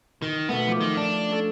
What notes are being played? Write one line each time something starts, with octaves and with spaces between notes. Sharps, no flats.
D#3
B2 A3 B3
F3 D6
D#3
D4
C#4 A4